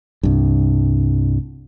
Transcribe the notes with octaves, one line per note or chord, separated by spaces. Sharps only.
C2 G2